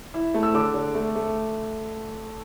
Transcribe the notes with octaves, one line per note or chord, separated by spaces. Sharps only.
E4
A3
E6
D3 D6
D3
A3
A3